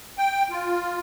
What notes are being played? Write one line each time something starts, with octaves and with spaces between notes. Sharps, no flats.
G5
F4